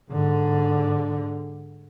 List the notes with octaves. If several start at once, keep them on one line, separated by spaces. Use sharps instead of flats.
G#2 D3